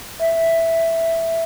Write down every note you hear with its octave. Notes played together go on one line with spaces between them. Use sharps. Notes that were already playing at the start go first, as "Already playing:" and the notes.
E5